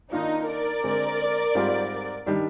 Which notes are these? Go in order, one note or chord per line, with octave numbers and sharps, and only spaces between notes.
D#3 A#3 D4 D#4 F4
A#4 D5
D3 G#3 C4
G#2 G3 C4 F4 G#4
D#3 G3 D4